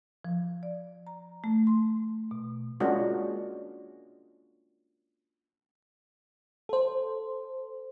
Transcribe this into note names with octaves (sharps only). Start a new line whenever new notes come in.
F3
D5
A#5
A3
C6
B2
G#3 A#3 C#4 D4 F4 F#4
A4 C5